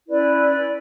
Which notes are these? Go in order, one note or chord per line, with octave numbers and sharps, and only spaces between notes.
C#4 E4 B4 D5
D5